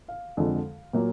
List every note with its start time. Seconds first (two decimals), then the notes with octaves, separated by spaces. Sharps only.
0.08 F5
0.37 F2 D3 F3 G#3
0.93 A#2 F#3 A#3